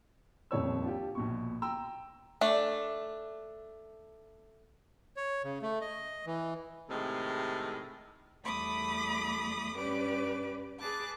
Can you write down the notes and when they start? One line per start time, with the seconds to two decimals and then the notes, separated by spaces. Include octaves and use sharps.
0.51 D#1 F2 C#5 E6
0.84 D4 F4 G4
1.15 A#1 B2 C#6
1.62 G5 A#5 E6
2.41 A3 D4
5.17 C#5
5.44 C#3
5.62 A3
5.81 D#5
6.26 E3
6.89 A2 C3 D#3 G#3 G#4
8.44 E2 G3 A3 B5 D6 D#6
9.74 G2 C#4 G4 B4 D5 D6
10.80 G#4 B4 A5 D6 F#6